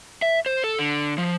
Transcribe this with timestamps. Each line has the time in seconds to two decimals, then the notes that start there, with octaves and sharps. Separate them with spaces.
0.22 E5
0.46 C5
0.64 A4
0.79 D3
1.18 F3